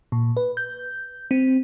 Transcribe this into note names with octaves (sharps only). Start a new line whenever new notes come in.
A#2
B4
G6
C4